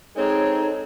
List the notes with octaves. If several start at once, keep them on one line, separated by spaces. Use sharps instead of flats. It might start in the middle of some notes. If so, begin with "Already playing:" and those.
G#3 C4 D#4 A4 C#5